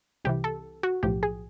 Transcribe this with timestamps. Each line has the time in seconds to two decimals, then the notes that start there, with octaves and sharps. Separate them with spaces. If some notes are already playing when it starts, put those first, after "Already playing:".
0.25 C2 C3 E3 G4
0.44 A4
0.83 F#4
1.03 B1 A2 F3 G4
1.23 G#4